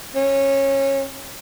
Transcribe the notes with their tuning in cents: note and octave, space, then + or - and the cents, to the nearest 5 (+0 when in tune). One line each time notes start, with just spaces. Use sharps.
C#4 -20